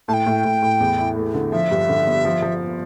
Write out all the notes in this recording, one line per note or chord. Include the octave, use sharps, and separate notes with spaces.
A2 A5
G5
A2
A2
A2
E2
E4
A3
D3
F3 E5
G2
D3
G1
F3
F3